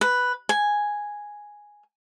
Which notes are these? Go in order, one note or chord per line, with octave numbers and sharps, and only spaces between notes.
B4
G#5